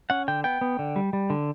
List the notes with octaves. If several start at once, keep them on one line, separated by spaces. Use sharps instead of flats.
C#4 F#5
D3 G5
B3 G5
B3
D3
G3
G3
D3